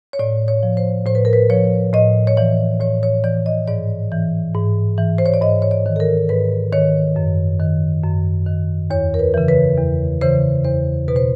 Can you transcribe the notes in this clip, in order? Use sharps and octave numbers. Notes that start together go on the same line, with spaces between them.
C#5
A2 D5
C#5
F3
C5
A2 C5
B4
A#4
B4
F3 C#5
A2 D#5
C#5
E3 D5
A2 C#5
C#5
E3 D5
D#5
G#2 D5
E3
G#2
E3
C5
C#5
D5
G#2 D#5
C#5
D5
D#3
A4
A#4
G#2 B4
D#3 C#5
F#2
D#3
F#2
D#3
E2 C#5
A#4
B4
C#3 E3
B4
E2
C#3 E3 C5
E2 C5
B2 B4
C5